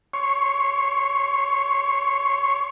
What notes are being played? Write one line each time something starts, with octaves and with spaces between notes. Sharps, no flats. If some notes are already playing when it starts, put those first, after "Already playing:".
C#5 C6 C#6